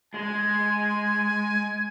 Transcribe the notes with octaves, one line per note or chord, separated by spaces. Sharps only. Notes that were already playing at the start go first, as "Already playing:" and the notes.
G#3 G#5